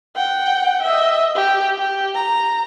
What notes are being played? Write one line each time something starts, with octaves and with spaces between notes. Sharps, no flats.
F#5 G5
D#5 E5
G4
G4
A#5